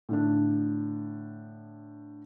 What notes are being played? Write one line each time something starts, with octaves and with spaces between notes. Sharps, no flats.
A2 D3 D4